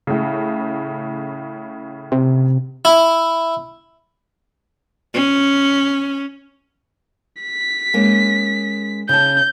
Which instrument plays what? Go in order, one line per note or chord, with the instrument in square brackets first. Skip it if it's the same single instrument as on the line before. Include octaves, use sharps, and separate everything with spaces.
[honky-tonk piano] A2 C#3
[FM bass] C3
[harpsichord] E4
[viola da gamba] C#4
[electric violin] B6
[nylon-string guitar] G#3 A#3 C#4
[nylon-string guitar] C#3 A5 [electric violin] G6